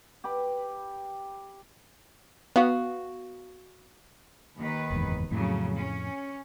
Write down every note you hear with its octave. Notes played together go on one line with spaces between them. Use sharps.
G4 B4 B5
B3 F#4 F5
D#2 D#3 B4
F#1 E2 G#2
F2 A2 C#3 F#3
C#4